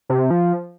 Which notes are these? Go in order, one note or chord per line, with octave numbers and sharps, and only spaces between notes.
C3
F3